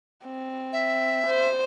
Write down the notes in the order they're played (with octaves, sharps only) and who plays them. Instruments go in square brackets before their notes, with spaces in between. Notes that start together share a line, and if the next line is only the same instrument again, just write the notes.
[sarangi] C4
[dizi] E5
[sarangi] C5